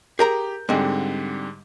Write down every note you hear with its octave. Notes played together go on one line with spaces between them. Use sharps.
G4 G#4 A#4 A#5 G6
G#2 D3 G3 G#3 C4